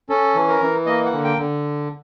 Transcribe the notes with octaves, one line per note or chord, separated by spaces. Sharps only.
C#4 A4
E3
A#4
E3
A#3 D#5
F#5
D3
G5
D3